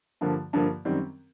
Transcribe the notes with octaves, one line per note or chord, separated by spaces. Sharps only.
G2 D3 F3 A#3
G2 D3 F3 A#3
F#2 D#3 G3 C4